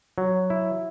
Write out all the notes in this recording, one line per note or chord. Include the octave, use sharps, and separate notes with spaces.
F#3
E4